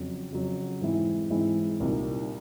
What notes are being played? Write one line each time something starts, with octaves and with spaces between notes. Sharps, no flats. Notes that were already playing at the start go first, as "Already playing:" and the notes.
Already playing: F2 C#3 F#3
F2 C#3 F#3
G#2 E3 G#3 C4 E4
G#2 E3 G#3 C4 E4
C2 A#2 G3 A#3 D#4